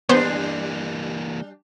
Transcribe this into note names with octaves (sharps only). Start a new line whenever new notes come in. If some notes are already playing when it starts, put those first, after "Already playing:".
E3 G3 A#3 B3 D4 C5